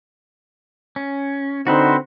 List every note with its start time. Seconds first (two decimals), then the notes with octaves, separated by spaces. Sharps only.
0.96 C#4
1.67 D3 C4 D#4 F#4 B4 C5